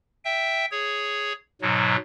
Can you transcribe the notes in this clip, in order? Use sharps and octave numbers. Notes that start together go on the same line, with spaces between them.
E5 G5
G#4 C#5
G#2 B2 F#3